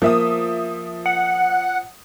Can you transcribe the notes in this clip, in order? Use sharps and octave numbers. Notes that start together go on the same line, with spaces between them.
F3 A#3 E5 D#6
F#5